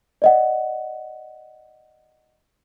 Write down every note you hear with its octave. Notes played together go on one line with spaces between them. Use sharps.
D5 D#5 F#5